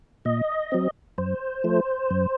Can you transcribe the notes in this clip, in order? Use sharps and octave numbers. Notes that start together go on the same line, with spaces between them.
A#2 D#5
F#3 C4
F#2 C5
F3 A3
F#2